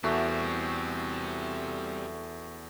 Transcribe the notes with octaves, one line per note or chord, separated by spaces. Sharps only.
E2 G3 A3 C4 F#4